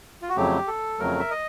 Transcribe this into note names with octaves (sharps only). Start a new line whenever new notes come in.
F4
F#4
F2 C#3 F#3 A3 G4
A4
F2 C#3 F#3 A3 A#4
E5
D#5